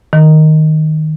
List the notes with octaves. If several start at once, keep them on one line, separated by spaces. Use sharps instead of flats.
D#3